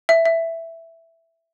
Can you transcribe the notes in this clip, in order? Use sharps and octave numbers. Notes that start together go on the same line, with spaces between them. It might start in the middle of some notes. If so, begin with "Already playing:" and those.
E5
E5